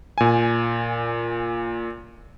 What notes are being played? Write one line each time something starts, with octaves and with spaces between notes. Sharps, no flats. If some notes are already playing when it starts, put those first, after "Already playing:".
A#2 G#5